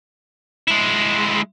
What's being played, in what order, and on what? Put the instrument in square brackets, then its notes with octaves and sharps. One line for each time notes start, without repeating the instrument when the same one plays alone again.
[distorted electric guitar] G#3 E4